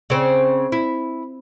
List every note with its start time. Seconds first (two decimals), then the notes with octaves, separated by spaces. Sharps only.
0.10 C#3 C4
0.72 E4